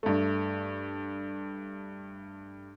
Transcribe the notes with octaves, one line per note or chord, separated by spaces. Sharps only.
G2 A3